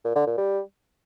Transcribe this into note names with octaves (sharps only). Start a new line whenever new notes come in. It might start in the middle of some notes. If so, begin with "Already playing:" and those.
A#2
D3
A#2
G3